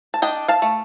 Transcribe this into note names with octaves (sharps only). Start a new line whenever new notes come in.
A5
D4 D#5 G5
F5 A5
A3